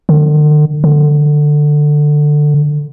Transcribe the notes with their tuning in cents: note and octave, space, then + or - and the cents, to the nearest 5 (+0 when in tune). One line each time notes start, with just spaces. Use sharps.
D3 +40
D3 +15